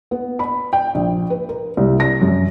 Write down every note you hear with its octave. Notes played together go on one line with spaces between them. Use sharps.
B3
B5
G5
A#1
B4
A#4
C2
A#6
F#2